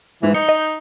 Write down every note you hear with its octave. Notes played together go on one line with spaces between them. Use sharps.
G#2 E3
D#4 G6 C#7
D#5